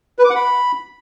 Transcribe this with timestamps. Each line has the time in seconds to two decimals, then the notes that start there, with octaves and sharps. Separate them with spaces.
0.19 B4
0.24 D6
0.30 F#5
0.36 B5